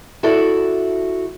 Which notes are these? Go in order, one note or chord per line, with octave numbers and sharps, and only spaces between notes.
E4 F#4 A4 D5